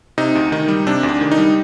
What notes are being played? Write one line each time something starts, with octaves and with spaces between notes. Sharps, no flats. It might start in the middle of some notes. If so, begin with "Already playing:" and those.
C3 D#4
D2
D#3 D#4
G3
C3 D4
D2
D4
D#3
D#4
G3